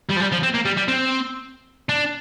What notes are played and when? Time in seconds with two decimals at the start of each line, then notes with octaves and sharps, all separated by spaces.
0.09 G3
0.16 F3
0.20 G3
0.32 F3
0.43 C4
0.54 A#3
0.65 G3
0.77 G3
0.88 C4
1.89 D4